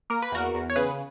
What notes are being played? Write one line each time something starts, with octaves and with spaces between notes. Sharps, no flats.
A#3 A#4
B4
E2 F#4 A#4
E2
C#5
C#3 G#4 B4